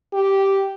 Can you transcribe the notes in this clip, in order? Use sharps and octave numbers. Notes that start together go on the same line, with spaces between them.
G4